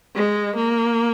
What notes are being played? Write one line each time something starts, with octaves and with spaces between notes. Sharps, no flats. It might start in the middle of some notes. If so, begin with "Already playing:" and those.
G#3
A#3